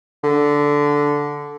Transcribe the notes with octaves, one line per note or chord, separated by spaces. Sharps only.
D3